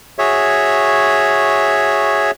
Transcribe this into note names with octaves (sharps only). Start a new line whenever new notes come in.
F#4 G#4 C#5 E5